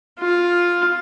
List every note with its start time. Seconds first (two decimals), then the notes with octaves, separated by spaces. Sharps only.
0.19 F4